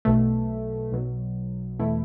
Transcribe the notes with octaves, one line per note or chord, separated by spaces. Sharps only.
B1 B2 A3
B1 B2 F#3
E2 B2 A3 E4